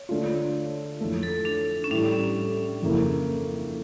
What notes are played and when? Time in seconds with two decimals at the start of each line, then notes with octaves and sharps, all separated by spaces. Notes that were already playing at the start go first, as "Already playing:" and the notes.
Already playing: C#5
0.09 D3 A3 D4 F4
1.01 F2 E3 A3
1.23 A4
1.45 D4
1.84 C#4
1.91 A2 E3 G3 D4
2.82 F2 C#3 E3 A#3 E4